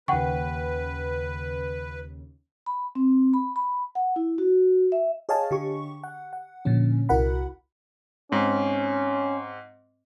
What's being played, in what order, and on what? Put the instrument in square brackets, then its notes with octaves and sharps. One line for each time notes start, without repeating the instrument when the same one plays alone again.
[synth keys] D#2 C#3 [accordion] B4 [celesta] F#5 G5 C#6
[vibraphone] B5
C4
B5
B5
F#5
E4
F#4
E5
[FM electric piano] G#4 C#5 D#5 F5 G#5 A5
D3 G4 C#6
F#5
F#5
A#2 D3 F3 C#4
C2 E4 F#4 A#4 F#5 B5
[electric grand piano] G#2 C4 [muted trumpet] C#4